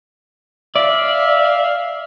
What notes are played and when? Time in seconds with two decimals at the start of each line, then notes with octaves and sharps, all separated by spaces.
0.76 D5 E5 F5